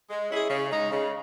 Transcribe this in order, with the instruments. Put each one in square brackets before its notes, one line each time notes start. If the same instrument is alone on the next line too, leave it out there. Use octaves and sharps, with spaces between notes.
[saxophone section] G#3
C#4 E4 G#4
C#3
G#3 D#4
C#3